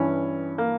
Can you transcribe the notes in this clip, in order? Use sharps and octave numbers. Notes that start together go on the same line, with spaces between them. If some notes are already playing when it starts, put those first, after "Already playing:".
Already playing: G2 E3 C#4
A#3